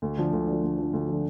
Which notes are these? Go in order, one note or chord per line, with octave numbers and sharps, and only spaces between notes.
D2
D3 F3
D2
D3 F3
D2
D3 F3
D2
D3 F3